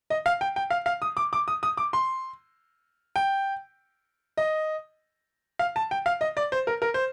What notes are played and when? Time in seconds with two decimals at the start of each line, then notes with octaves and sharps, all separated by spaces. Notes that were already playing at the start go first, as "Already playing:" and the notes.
0.10 D#5
0.26 F5
0.41 G5
0.56 G5
0.70 F5
0.86 F5
1.02 D#6
1.17 D6
1.33 D6
1.48 D#6
1.63 D#6
1.77 D6
1.93 C6
3.16 G5
4.37 D#5
5.59 F5
5.76 A5
5.91 G5
6.06 F5
6.21 D#5
6.37 D5
6.52 C5
6.67 A#4
6.82 A#4
6.94 C5